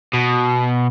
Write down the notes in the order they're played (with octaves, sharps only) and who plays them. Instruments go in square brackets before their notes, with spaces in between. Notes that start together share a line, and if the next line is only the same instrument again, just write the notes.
[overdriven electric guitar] B2